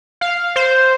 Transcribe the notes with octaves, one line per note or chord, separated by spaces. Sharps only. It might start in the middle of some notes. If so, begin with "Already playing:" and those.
F5
C5